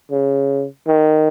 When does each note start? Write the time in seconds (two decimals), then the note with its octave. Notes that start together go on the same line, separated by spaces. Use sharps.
0.11 C#3
0.87 D#3